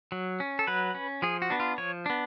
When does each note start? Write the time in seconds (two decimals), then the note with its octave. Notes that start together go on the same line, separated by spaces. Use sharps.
0.12 F#3
0.40 C#4
0.59 A4
0.67 F#3 B4
0.95 C#4
1.22 F3 G#4
1.42 F#4
1.50 B3 D4
1.60 F4
1.78 F3 C#5
2.06 B3 D4